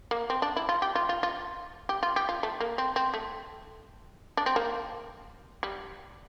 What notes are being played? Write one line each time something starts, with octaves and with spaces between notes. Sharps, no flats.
A#3
C4
D4
E4
F4
G4
F4
F4
F4
G4
F4
G4
F4
A3
A#3
C4
C4
A3
D4
C4
A#3
G3